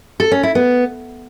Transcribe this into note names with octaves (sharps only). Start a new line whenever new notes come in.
A4
C#4
E4
B3